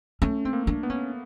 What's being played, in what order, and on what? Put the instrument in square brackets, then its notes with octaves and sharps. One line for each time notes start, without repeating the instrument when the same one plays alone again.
[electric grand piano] A3 [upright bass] C#4
[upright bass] C4
[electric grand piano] A#3
[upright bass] D4
[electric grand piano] B3
[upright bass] C#4